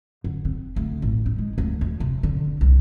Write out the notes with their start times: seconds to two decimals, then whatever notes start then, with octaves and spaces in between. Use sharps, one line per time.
0.24 D3
0.45 C4
0.76 D2
1.02 A1
1.26 D#4
1.38 G#3
1.58 D2
1.81 F2
2.00 C3
2.23 D3
2.61 C2